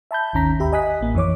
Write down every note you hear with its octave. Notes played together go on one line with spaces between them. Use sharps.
E5 A5 B5 G6
G#1 D#2 D#3 C#4 A#5 B6
D#2 G4 E5 B5
D#5 G#5 D#6 F#6 B6
A1 A#3
F2 E3 C#5 D6